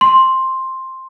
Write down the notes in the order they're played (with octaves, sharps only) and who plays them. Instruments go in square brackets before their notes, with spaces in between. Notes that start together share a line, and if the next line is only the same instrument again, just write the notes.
[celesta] C6